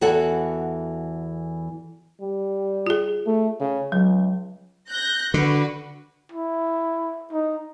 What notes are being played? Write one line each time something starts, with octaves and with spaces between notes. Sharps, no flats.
E2 E3 F#4 A4 F#5
G3
F4 G#4
A3
C#3
C#2 F#3
F#6 G6 A#6
D3 F#4 B4
E4
D#4